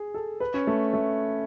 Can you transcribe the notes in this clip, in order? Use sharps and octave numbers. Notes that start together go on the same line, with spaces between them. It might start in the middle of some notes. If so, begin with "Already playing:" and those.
Already playing: G#4
A4
B4
C#4
A3
A3